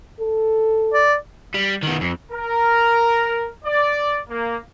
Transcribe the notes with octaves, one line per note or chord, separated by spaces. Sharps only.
A4
D5
G3
D#3 B3
F2
A#4
D5
A#3